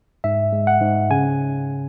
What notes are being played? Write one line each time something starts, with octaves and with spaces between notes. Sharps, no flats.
G#2 E5
G#3
F#5
G#2
C#3 G#5